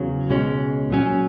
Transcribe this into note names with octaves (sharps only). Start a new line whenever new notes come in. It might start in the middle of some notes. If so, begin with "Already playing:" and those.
Already playing: E2 C#3 F#3
C#2 B2 G#3 C#4
A#2 F#3 C#4